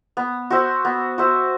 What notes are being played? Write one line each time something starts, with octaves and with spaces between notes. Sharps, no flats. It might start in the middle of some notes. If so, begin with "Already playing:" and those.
B3
F#4 C5 E5
B3
F#4 C5 E5